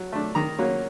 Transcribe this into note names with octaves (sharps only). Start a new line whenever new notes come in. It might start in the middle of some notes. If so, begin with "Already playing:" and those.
Already playing: F#3
A3 D4
D#3 A#5
F#3 A#3 C#4